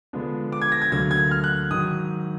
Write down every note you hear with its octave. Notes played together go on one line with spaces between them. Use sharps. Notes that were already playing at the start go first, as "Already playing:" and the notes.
D3 F3 G#3 B3 D4
D6
G#6
A#6
G#6
D2 D3 F#3 A#3 G#6
G#6
F6
F#6
G#2 D#3 F#3 D#6